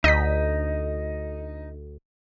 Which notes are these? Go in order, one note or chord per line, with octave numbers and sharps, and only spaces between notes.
D2 D#4 D#5 B6